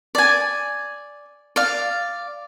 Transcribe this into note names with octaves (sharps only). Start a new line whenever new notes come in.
D5 G#5
D5 F5